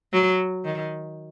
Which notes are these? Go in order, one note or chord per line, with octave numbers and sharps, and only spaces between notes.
F#3
D#3